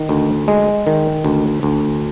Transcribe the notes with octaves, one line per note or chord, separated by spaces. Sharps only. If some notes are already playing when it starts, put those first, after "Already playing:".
Already playing: D#3
D2
G#3
D#3
D2
D2